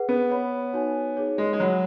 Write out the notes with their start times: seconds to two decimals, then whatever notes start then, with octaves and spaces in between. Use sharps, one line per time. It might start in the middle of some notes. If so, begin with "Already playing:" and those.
Already playing: G#4 B4 F#5
0.09 B3
0.30 C#5 F#5 B5
0.73 D#4 F#4 C#5 G#5
1.17 D#4 G#4 C#5
1.38 G#3
1.53 G#3
1.60 F#3 C#5 F#5 B5